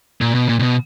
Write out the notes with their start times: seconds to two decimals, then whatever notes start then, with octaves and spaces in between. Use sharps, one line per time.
0.21 A#2
0.35 B2
0.49 A#2
0.59 A#2
0.62 B2